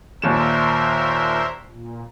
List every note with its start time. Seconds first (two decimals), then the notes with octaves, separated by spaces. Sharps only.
0.22 D#2 A#2 A#4 C5 E5 E7
1.65 A#2